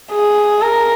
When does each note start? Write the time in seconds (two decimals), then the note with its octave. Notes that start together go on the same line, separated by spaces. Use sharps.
0.11 G#4
0.61 A#4